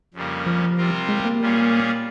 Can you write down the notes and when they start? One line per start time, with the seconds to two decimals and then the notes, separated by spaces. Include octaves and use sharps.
0.14 F2 C#3 G3 A#3
0.46 F3
0.78 C3 G3 C4 F4 A#4
1.09 G#3
1.25 A#3
1.40 A#2 G3 C#4 F4 G#4